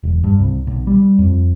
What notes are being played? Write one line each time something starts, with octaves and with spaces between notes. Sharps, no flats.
E1
G2
C2
B1
G3
F2